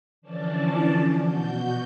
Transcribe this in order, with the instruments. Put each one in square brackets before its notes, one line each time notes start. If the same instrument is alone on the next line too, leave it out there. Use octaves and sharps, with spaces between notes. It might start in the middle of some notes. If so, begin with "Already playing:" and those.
[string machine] D3 E3 F3 C#4 D5 A5
B2 F#4 G6